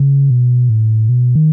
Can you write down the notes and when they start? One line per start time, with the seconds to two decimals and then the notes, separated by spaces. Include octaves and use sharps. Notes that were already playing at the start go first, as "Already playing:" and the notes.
Already playing: C#3
0.30 B2
0.69 A2
1.09 B2
1.35 D#3